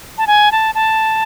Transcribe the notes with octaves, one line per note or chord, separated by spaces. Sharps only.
A5
G#5
A5
A5